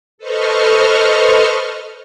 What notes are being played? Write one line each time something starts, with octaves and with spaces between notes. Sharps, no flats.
A4 B4 C5 D#5 C#6 F6